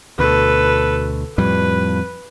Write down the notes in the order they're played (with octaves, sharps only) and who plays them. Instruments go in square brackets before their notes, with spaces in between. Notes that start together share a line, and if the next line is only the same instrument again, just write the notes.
[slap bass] D2 B2 [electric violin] A4 B4
[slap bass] F2 A2 G3 [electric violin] B4